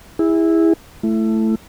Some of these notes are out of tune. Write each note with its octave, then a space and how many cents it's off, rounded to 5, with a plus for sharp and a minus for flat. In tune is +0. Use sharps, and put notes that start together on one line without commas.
E4 -10 G#4 -30
A3 +0 E4 +20